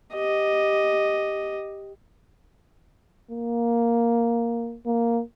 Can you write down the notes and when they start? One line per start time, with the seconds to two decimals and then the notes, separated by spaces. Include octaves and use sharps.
0.14 G4 D#5
3.31 A#3
4.86 A#3